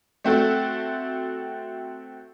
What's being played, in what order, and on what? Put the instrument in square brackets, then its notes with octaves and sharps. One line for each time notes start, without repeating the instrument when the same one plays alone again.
[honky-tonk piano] A3 C4 F#4 A4